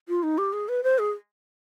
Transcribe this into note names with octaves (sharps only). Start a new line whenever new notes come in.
F4
D#4
G4
G#4
B4
C5
G#4